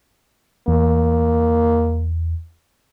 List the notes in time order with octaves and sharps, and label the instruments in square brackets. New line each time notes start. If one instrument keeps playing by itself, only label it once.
[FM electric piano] E2 [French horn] A#3